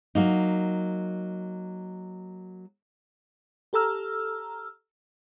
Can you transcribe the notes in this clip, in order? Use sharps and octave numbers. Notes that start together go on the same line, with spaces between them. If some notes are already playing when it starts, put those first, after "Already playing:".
F#3 A#3 D#4
G4 A4 A#5 E6 F6